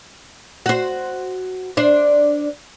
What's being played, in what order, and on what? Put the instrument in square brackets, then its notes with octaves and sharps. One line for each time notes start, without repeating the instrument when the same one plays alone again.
[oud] F#4 C5
D4 C5